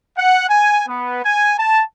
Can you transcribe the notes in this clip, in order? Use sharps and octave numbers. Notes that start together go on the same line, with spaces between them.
F#5
G#5
B3
G#5
A5